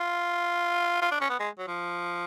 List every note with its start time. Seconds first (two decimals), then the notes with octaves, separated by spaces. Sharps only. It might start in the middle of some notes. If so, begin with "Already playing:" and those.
Already playing: F4
1.02 F4
1.11 D4
1.21 C#4
1.30 B3
1.40 G#3
1.58 F#3
1.67 F3